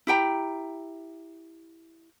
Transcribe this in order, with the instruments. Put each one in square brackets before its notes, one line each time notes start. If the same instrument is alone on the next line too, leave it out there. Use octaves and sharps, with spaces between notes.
[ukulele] E4 G4 G5 A#5